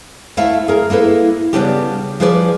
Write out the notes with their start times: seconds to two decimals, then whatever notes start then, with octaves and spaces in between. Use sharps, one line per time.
0.37 D2 A3 E4 F5
0.68 G#4 A#4
0.90 A#3 E4 A4 B4
1.53 C#3 G3 G#3 B3 D4 G4
2.20 F3 G3 G#4 B4 C#5 D5